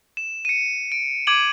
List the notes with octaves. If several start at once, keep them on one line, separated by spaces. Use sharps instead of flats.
E7
C#7 D#7
D7
D6 G#6 D7 D#7 F#7